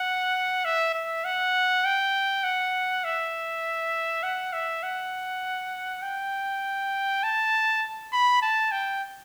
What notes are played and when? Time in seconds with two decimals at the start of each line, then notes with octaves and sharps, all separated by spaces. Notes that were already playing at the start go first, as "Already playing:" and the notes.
Already playing: F#5
0.65 E5
0.94 E5
1.24 F#5
1.85 G5
2.44 F#5
3.04 E5
4.23 F#5
4.53 E5
4.83 F#5
6.03 G5
7.23 A5
8.13 B5
8.42 A5
8.71 G5